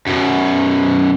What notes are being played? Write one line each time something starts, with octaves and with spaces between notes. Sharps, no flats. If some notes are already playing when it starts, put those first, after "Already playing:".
F#2 B2